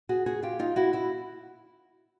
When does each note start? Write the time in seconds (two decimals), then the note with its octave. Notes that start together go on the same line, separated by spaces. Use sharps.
0.09 F#4 G#4
0.26 F#4 G#4
0.43 F4 G4
0.59 D#4 F4
0.76 E4 F#4
0.93 E4 F#4